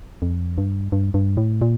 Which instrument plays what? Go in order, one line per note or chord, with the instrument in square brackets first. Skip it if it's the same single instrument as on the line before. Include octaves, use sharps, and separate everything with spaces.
[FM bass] F2
G2
G2
G2
A2
A#2